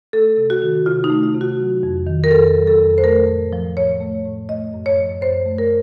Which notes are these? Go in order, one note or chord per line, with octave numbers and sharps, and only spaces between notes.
A3 A4
C3
F#4
D#3
C3 F4
D#4
A3
F4
C3
F#4
F#3
F2
D#3
A#4
F2 A4
F#3
A4
F2
C5
A3 A#4
A2
F3
A2 C#5
A3
A2
A3 D#5
F#2
C#5
F3
F#2 C5
A3
A#4